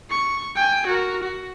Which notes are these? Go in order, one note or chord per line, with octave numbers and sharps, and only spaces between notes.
C#6
G5 G#5
F#4 A#4
F#4